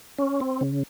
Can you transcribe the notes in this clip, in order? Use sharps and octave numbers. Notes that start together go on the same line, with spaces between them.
C#4
C4
C#3